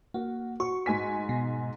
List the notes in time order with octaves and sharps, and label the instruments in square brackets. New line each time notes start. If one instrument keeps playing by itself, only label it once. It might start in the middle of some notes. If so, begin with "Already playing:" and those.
[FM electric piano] A#3 [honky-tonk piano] F#4
[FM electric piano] F#4 [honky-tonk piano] C#6
[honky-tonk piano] G#2 G#5 B6
[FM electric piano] B2